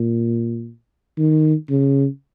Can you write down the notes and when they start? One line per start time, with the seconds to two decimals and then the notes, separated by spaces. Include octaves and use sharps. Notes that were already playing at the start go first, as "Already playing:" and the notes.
Already playing: A#2
1.18 D#3
1.70 C#3